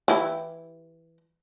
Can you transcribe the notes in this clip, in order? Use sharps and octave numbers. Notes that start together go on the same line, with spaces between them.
E3 E4 G4